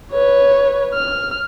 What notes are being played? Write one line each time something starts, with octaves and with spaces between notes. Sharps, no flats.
B4 C#5
F6